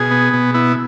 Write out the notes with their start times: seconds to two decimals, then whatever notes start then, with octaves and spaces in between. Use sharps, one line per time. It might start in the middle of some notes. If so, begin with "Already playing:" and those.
Already playing: B2 G#4
0.11 B3
0.34 B2
0.54 B3 E4